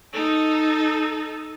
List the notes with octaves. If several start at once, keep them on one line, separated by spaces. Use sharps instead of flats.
D#4 A4